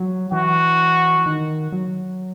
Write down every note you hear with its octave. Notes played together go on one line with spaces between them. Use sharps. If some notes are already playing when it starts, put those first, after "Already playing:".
Already playing: F#3
E3 F#4
D#3
F#3